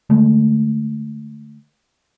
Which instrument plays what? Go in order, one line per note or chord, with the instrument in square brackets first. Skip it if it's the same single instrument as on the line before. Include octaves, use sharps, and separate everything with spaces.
[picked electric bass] D3 G#3 A3